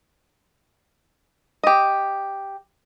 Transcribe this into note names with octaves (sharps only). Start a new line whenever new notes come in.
G4 D#5